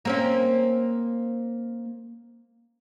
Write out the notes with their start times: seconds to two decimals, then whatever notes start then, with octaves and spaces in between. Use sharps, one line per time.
0.05 A#3 C4 C#4